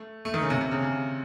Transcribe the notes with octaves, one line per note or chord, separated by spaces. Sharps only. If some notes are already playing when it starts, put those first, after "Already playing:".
Already playing: A3
A3
D#3
C#3
C3
C3
C#3
C#3